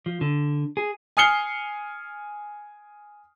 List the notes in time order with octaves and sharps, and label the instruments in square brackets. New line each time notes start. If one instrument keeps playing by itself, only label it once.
[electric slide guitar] F3
D3
G#4
[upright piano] G#5 D#6 F6 C7 C#7 G7